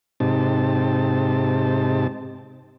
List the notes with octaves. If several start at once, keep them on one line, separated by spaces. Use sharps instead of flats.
G#2 C3 C4 D#4 G4 A5